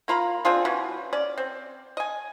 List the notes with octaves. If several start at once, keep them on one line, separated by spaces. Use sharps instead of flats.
A#3 F4 A#5 B5
C4 D4 F4 G#4
B2 E3 C#4 F#4
C#4 D5
C4
D#5 G#5